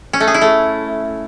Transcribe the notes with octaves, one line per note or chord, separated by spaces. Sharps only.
C#4
A3
G#4
E4
A3